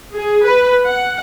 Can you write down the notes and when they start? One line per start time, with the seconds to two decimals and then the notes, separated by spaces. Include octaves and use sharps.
0.13 G#4
0.45 B4
0.85 F#5